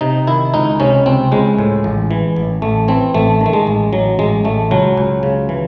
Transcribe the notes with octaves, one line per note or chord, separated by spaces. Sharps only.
C3 D#4
D#3 E4
C#2 D#4
C3 C#4
C#2 C4
C#2 G#3
A2
A1
E3
A1
A1 A3
E3 C4
A1 A3
D#3
A3
G#3
A1
A1 F#3
A1 G#3
A1 A3
C#2 F#3
C#2
C#3
E3